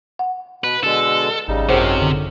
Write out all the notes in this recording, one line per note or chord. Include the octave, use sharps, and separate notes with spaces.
F#5
B2 B4
B2 D3 G#3 A4
G#1 C#3 G3 D#4
F#2 C3 D#3 F#3 C#4 G#4 C5
D3